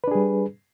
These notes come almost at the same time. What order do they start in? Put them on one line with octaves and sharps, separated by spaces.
B4 D4 G#4 G3